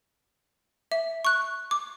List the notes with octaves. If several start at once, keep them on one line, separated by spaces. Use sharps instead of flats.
E5
C#6 F#6
D6